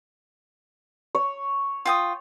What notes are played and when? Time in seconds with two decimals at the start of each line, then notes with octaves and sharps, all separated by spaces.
1.15 C#5
1.85 F4 G5 D#6